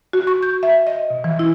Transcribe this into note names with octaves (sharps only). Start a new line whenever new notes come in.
F#4
C#6
G6
E5
D#5
B2
E3
E4